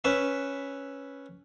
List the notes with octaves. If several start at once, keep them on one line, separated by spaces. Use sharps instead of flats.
C#4 B4 E5